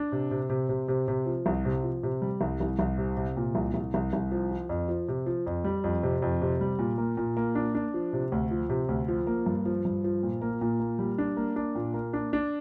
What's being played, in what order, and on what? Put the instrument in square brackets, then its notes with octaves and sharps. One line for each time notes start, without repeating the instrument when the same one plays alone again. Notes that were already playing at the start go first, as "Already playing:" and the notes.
Already playing: [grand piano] D4
C3
C3
C3
C3
C3
C3
F3
C2
C3
F3
C3
G3
C2
C2
C2
C3
C3
A#2
C2
C2
C2
C2
F3
F3
F2
F3
C3
F3
F2
G3
F2
C3
F2
C3
G3
A#2
A#3
A#2
A#3
D4
D4
F3
C3
D2
F3
C3
D2
F3
A#3
G2
F3
G2
F3
A#2
A#3
A#2
A#3
G3
D4
A#3
D4
A#2
A#3
D4
D4